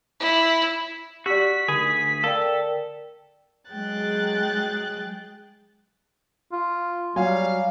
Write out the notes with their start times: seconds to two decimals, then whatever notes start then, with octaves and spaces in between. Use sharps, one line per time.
0.20 E4
1.26 F#4 G4 D5 B6
1.68 D2 D3 G#4
2.24 A4 A#4 D5 F5 G5
3.71 F#3 G#3 G#4 G5 F#6 A6
6.52 F4
7.16 F#3 G3 F5 G#5